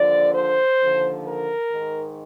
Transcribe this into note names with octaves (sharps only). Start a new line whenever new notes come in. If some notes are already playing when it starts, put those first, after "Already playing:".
Already playing: D#2 D3 F3 D5
C5
D#2 D3 F3
A#4
G#2 D#3